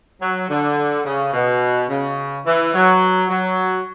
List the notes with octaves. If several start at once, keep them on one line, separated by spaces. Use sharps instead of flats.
F#3
D3
C#3
B2
C#3
E3
F#3
F#3